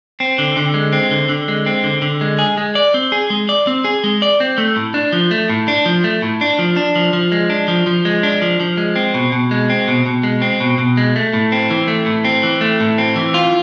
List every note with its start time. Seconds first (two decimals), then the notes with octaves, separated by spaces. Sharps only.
0.20 C4
0.38 D3
0.57 D3
0.74 G#3
0.92 C4
1.11 D3
1.29 D3
1.48 G#3
1.66 C4
1.84 D3
2.02 D3
2.21 G#3
2.39 G#4
2.57 G#3
2.75 D5
2.94 C4
3.12 G#4
3.30 G#3
3.49 D5
3.67 C4
3.84 G#4
4.04 G#3
4.22 D5
4.40 C4
4.58 A3
4.76 A2
4.94 D4
5.13 F3
5.31 A3
5.49 A2
5.68 D4
5.86 F3
6.04 A3
6.22 A2
6.41 D4
6.59 F3
6.76 D4
6.95 F3
7.13 F3
7.32 G#3
7.50 D4
7.68 F3
7.87 F3
8.05 G#3
8.23 D4
8.42 F3
8.60 F3
8.77 G#3
8.96 C4
9.14 B2
9.32 B2
9.51 G#3
9.70 C4
9.88 B2
10.06 B2
10.23 G#3
10.42 C4
10.60 B2
10.78 B2
10.97 G#3
11.16 A3
11.33 A2
11.52 C4
11.70 E3
11.88 A3
12.06 A2
12.25 C4
12.43 E3
12.61 A3
12.80 A2
12.98 C4
13.16 E3
13.34 F4